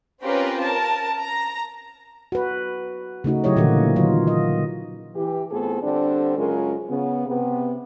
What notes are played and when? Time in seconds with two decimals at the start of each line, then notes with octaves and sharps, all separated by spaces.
0.23 C4 C#4 F4 G4 A#4 B4
0.62 A#4 A5
1.20 A#5
2.32 F#4 B4
3.24 C#3 A3 D#4 F#4
3.44 C#3 F#3 E4 G4 C#5 D#5
3.56 A#2 D3 E3 F3 A#3 F#4
3.96 D#3 F#3 D#4 F4 C#5
4.27 D#5
5.15 E3 G4
5.51 A2 B3 C4 F4 G#4 A4
5.81 D3 G3 C4 D4
6.37 F#2 C#3 G#3 F4 A#4
6.89 C#3 B3
7.27 C3 B3